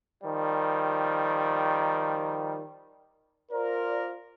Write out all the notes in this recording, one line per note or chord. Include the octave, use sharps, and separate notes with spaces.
D#3 F3 G3
F4 A#4 C5 D5